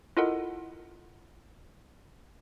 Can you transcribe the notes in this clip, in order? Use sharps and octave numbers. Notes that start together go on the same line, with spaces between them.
E4 F4 A4 A#4 D#5 F#5